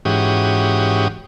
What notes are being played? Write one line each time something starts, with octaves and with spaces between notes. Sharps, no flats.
G#2 E3 C#4 F#4 G4 D#6